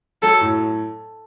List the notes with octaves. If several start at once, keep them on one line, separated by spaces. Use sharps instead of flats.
F#3 A4
A2